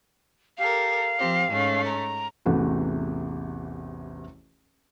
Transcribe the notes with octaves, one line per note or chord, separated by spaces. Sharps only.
G4 A4 A#4 F5
F3 C4 G4
G#2 A3 C#4
A#5
A1 E2 C3 A3 E4 F#4